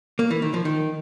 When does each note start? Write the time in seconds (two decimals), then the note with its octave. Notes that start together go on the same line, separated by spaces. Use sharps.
0.19 A#3
0.31 E3
0.42 D#3
0.54 F3
0.65 D#3